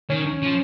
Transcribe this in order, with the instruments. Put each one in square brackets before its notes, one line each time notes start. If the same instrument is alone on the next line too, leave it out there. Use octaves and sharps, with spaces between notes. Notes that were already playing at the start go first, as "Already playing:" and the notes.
[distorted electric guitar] D#3 [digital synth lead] C#4
[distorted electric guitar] F3